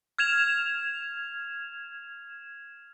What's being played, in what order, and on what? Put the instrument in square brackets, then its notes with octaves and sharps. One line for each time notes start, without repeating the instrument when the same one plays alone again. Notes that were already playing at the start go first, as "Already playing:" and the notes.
[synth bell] F6 G#6 E7 F7